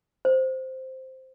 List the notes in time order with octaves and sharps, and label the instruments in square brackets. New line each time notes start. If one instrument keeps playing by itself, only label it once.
[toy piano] C5